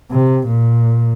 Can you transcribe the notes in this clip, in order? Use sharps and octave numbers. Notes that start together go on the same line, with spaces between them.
C3
A#2